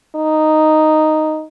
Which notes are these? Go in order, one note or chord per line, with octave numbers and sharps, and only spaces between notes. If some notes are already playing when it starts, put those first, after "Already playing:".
D#4